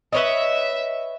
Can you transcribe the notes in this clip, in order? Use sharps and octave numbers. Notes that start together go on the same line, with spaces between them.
B4 C#5 D#5 E5